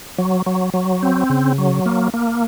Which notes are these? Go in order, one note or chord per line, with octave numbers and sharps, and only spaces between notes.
F#3
F#3
F#3
C4
C#3
F#3
A#3
A#3